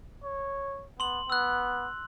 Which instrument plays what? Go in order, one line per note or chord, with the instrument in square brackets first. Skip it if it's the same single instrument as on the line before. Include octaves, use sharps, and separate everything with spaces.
[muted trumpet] C#5
[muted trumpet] B3 [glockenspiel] C6 F#7
[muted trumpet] B3 [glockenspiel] E6 F#6